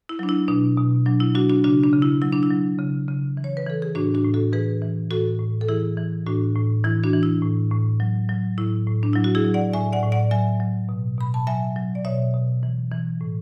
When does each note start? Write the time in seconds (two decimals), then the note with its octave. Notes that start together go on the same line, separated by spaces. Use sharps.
0.09 E4
0.19 F#3 D4
0.29 E4
0.48 B2 D4
0.77 B2
1.06 F#3 D4
1.20 E4
1.35 F#3 D4 F#4
1.49 D4 F#4
1.64 C#3 D4 F#4
1.84 D4
1.93 C#3
2.02 E4
2.22 F#3 E4
2.32 D4
2.43 E4
2.51 F#3
2.79 C#3
3.09 C#3
3.37 E3
3.44 C#5
3.57 B4
3.66 E3 A4
3.82 G#4
3.95 A2 D4 F#4
4.14 D4 F#4
4.24 A2
4.34 F#4 A4
4.53 E3 G#4 B4
4.82 E3
5.11 A2 F#4 A4
5.39 A2
5.61 A4
5.69 E3 E4 G#4
5.97 E3
6.26 A2 D4 F#4
6.55 A2
6.84 E3 E4
7.04 D4 F#4
7.13 E3
7.23 E4
7.42 A2
7.71 A2
8.00 F#3
8.29 F#3
8.58 A2 E4
8.87 A2
9.03 D4
9.13 F#3 E4
9.24 F#4
9.35 E4 G#4
9.45 F#3
9.54 D5 F#5
9.73 A2 E5 G#5
9.93 D5 F#5
10.02 A2
10.12 D5 F#5
10.31 F#3 E5 G#5
10.60 F#3
10.89 B2
11.18 B2 B5
11.34 A5
11.47 F#3 E5 G#5
11.76 F#3
11.95 D5
12.05 B2 C#5 E5
12.34 B2
12.63 E3
12.92 E3
13.21 A2